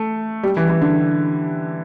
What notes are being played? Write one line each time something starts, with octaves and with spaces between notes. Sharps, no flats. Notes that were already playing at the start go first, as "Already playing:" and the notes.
Already playing: A3
G3
E3
E3
D3